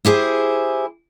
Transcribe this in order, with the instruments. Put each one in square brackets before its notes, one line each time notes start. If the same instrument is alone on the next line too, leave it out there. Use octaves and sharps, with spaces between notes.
[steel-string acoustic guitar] E4 G4 G#4 C5